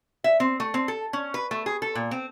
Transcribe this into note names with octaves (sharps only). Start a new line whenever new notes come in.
E5
C4
A3
C4
A4
C#4
B4
A3
G#4
A4
A#2
C4